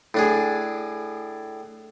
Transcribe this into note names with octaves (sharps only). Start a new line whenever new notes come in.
A2 D4 G#4